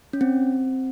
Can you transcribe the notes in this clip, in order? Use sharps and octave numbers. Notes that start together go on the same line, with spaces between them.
C#4
C4